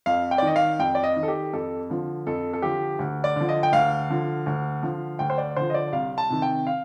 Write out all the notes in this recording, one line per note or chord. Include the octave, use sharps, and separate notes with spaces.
F2 F5
G5
D5
D#3 D#5
F5
F2 G5
D5
D#5
D#3
A4
G4
F2 A4
D3 F3
F2 A4
A4
D3 F3 G4
D2
D5
D3 F3
D#5
G5
D2 F5
D3 F3
D2
D3 F3
D2 G5
C5
D5
D3 F3 C5
D#5
D5
C2 F5
A5
C3 D#3
G5
F5